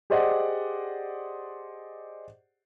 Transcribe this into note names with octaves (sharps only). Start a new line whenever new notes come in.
G4 G#4 C5 D5 D#5 F#5